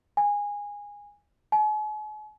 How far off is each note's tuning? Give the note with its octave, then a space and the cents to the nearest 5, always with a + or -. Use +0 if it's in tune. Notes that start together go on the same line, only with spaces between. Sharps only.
G#5 -15
G#5 +40